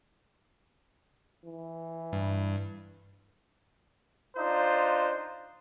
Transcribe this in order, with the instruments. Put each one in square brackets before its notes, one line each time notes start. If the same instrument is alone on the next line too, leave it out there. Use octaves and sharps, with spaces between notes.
[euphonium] E3
[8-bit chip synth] G2
[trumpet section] D4 D#4 F4 C5